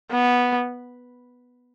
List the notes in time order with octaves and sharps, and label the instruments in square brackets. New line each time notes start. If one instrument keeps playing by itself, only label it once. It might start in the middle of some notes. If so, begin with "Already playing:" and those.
[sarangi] B3